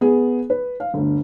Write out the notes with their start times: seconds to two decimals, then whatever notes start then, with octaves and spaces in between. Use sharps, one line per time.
0.01 B3 G#4
0.50 B4
0.80 F5
0.94 G1 D2